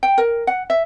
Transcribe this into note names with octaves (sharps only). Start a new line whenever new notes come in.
G5
A#4
F#5
E5